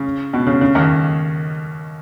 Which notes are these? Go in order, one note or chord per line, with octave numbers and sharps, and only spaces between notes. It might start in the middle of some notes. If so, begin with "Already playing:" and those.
Already playing: C#3
B2
C#3
C#3
D#2 D#3